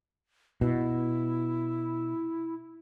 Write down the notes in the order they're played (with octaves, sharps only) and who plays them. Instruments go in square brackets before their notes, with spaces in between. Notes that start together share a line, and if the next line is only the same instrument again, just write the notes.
[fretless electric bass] B2 [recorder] E4